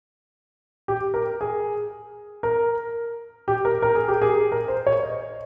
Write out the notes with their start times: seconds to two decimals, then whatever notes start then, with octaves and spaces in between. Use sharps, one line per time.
0.88 G4
1.14 A#4
1.41 G#4
2.43 A#4
3.48 G4
3.65 A#4
3.82 A#4
3.95 G#4
4.08 G4
4.22 G#4
4.52 A#4
4.68 C5
4.87 C#5
5.03 D#5